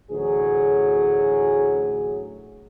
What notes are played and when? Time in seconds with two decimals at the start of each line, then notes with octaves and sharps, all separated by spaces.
0.11 A1 D2 A2 F#3 G#4